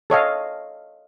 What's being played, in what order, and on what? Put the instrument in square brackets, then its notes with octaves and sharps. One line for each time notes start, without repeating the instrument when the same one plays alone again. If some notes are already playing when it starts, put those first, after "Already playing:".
[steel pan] A4 C#5 D#5 F5